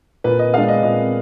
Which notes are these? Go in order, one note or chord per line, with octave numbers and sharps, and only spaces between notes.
A#2 B4
D#5
G#3 B3 D4 F5
D#5
A#2 D#5